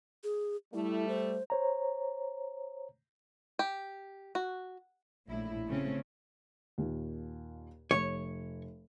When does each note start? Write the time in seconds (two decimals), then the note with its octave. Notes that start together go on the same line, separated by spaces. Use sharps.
0.24 G#4
0.74 G3 A3 E4
1.08 C5
1.50 C5 C#5 A#5
3.59 G4
4.35 F#4
5.29 A#1 A2 E4
5.68 C#3 A3 C4 C#4
6.78 D#2 A#2
7.91 F1 C#5